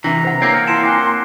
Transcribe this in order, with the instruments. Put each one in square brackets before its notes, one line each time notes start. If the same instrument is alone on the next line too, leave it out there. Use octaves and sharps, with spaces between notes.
[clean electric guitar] C3 E3 [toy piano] D4 E5 [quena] A#5 [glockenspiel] A#6
[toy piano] C5 F#5
[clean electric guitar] A#3 C4 [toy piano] C#5 F#5 D6 [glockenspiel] E6 G6 G#6
[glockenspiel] F6 C#7 D7
[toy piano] E4 F5 A5 [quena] C6 [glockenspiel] C7 C#7 E7
[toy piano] E4 F#5 G#5 [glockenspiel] D6 F#6